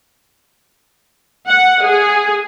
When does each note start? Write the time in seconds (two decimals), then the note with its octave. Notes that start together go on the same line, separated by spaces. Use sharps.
1.48 F#5
1.85 G#4